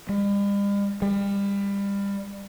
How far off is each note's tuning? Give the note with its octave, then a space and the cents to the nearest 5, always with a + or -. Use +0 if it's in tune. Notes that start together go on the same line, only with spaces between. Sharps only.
G3 +45
G3 +30